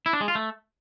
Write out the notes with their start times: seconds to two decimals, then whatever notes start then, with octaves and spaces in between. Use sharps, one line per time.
0.06 E4
0.13 D4
0.21 G#3
0.28 F4
0.35 A3